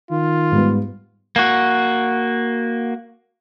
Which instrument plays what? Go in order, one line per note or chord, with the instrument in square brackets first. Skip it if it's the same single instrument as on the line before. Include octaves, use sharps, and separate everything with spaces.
[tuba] D#3 [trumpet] F4
[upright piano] G#2 G3 B3
[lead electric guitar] A#3 F#4